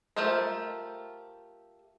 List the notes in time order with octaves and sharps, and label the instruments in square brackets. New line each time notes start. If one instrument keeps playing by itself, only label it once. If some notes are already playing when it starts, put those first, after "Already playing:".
[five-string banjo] A3 F4 G4 A#4 C5